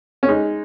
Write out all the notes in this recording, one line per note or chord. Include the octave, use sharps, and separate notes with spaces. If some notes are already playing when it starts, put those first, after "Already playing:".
C#4
G#3 D#4